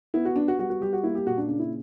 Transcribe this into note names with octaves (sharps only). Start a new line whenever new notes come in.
B3 E4
F#4
B3 D4
F#4
G3 F#4
F#4
G3 G4
F#4
A#3 E4
G4
A#2 F#4
D4
C#3 D4
E4